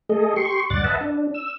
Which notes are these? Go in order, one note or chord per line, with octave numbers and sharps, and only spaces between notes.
A3 G#4 A4 D#5
G4 C6 C#6
D2 G2 D5 F#5 A6
B4 D#5 E5 F#5 A5
D4
E6